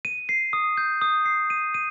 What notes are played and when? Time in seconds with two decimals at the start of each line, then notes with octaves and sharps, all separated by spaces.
0.05 D#7
0.29 C7
0.53 D#6
0.77 G6
1.02 D#6
1.26 C7
1.50 D#7
1.74 D#7